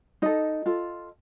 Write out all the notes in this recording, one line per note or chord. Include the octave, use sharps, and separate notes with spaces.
D#4 A4 D#5
F4 A4